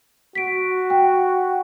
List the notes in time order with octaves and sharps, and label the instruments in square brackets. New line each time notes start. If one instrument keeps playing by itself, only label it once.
[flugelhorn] F#4 [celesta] B6 D7
[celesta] G5